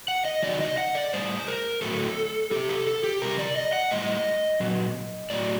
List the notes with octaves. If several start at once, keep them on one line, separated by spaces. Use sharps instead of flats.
F#5
D#5
C3 D#3 F#3 D5
D#5
F#5
D5
A2 G3 C5
A#4
A2 F#3 A4
C3 G3 G4
A4
A4
G4
C3 G3 A#4
D5
D#5
F#5
A2 G3 D#5
A#2 F#3
A2 F#3 D5